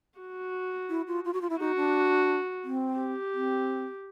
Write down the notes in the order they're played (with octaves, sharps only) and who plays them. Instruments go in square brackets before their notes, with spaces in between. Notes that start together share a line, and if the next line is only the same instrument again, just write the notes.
[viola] F#4
[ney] E4
F4
F4
F#4
F4
E4
[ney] D#4 [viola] F#4
[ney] D4
C4
[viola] G4
[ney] C4